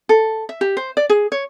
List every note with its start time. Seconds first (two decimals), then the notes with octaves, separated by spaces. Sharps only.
0.09 A4
0.49 E5
0.61 G4
0.77 C5
0.97 D5
1.10 G#4
1.32 C#5